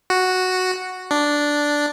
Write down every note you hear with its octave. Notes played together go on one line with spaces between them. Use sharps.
F#4
D4